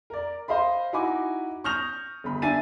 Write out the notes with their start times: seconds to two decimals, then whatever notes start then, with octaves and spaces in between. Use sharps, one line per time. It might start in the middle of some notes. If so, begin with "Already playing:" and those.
0.10 A#4 D5
0.48 C5 D#5 F5 B5
0.93 D#4 E4 F#4 G#5 B5 D6
1.64 C#6 D#6 F6 G6 A#6 F7
2.24 G1 B5
2.42 D4 E5 G#5 A6 D#7